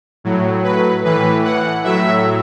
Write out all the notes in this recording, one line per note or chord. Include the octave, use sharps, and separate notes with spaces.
A2 F#3
B4
A2 E3 B4
F#5
A2 F#3 E5